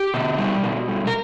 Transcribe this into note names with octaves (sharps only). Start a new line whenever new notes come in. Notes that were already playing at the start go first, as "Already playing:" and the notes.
Already playing: G4
B2
G3
B2
G3
A#4